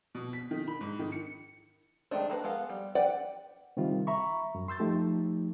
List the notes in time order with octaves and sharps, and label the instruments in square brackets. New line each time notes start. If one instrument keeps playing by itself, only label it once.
[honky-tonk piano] B2
B6
D#3
B5
G#2
D#3
C#7
[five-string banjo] D#3 F#3 G#3 A3 D4
A3 A#3 B4
G#3 B3 A4 F5
G3
B4 D5 F#5 G5
[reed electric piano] C3 D#3 G3 F4
E5 A#5 B5 C#6
F#2
C6 E6 G6 A6
F3 A3 D#4 G4